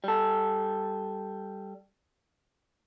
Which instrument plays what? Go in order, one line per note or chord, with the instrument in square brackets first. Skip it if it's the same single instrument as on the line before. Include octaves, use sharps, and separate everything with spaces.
[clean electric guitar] G3 A4